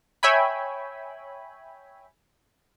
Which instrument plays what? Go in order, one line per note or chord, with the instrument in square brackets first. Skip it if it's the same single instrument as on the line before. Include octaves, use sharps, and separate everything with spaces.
[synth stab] C#5 E5 G5 G#5 B5